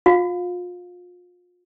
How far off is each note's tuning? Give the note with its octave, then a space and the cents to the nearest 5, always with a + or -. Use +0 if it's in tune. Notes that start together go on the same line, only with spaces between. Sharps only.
F4 +35 F5 +20